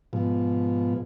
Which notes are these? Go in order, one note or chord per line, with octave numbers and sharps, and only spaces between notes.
G#2 B2 F3